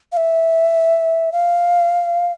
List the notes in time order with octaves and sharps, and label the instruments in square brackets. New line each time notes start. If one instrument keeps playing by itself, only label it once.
[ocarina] F5
E5
F5